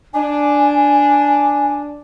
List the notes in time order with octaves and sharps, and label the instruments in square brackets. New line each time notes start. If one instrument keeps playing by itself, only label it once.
[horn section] D4 [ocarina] G#5